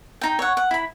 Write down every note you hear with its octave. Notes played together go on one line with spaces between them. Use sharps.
D#4 G5
C#5 F#5
F#5
E4 B5